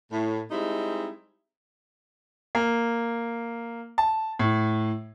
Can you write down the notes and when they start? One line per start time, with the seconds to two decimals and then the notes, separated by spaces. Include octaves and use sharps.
0.12 A2
0.51 G3 G#3 C4 D#4 E4
2.55 A#3
3.98 A5
4.39 A2